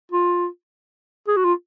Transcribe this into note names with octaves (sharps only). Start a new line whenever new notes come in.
F4
G#4
F#4
F4